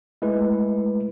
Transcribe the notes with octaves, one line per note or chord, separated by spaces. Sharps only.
G#3 A3 E4 B4